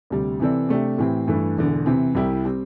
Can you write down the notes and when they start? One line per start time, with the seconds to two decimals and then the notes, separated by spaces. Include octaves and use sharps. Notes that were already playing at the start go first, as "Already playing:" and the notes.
0.10 D2 C3 G3
0.40 C3 E3 C4 A4 D5
0.69 C3 A3 D4 G4
0.98 A2 E3 C4 G4
1.27 G2 E3 A3
1.57 E1 E2 D3
1.86 C3 E3 C4
2.15 C2 C3 G3 E4 G4
2.45 G3 C4